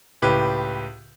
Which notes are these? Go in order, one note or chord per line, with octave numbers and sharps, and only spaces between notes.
C#2 A2 G4 B4